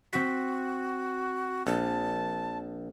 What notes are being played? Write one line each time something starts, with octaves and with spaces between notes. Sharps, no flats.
C4 F#4 B6
A#1 A5